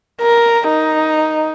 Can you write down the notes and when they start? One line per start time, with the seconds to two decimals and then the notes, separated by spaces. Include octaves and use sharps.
0.22 A#4
0.69 D#4